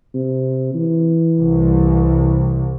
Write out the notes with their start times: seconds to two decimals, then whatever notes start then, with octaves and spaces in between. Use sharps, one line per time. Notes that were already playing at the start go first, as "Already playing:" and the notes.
0.15 C3
0.74 E3
1.39 C2